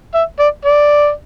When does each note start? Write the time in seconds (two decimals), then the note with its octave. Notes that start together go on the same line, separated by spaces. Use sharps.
0.15 E5
0.39 D5
0.65 D5